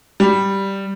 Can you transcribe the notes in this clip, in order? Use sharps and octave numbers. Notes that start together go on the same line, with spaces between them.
G3